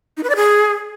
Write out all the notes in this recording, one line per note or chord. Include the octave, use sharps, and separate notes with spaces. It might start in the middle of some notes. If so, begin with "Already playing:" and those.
D#4
B4
D5
G#4